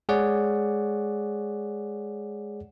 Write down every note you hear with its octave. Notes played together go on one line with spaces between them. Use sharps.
G#3 G#4 C#5 D5 F#5